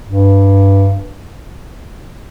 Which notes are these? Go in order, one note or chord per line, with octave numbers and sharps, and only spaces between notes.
G2